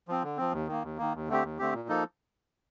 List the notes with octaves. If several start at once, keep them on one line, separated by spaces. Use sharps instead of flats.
F3 C4
D3
F3 C4
D#2
D#3 A#3
D#2
D#3 A#3
D#2
D3 A3 C4 G4
D#2
D3 A3 C4 G4
A#2
F3 A#3 D#4 A4